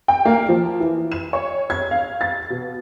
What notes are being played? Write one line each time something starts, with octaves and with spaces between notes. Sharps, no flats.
G5
A#3
F3
E3
E7
C#5
G#6
F5
A6
B2